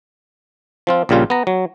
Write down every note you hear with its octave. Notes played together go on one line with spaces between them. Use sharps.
F3 C4 F4
A#1 A#2 C#3 G3 F4
B3 A#5
F#3